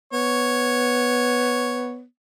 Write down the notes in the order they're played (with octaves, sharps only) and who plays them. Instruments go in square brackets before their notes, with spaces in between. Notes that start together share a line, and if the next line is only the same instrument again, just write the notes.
[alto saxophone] B3 [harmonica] C#5